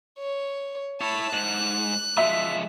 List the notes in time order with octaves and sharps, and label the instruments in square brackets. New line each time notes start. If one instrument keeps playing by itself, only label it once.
[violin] C#5
[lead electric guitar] E4 C#5 [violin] A5 B5
[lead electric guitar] G#2 [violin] F#6
[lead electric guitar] F3 G#3 [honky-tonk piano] E5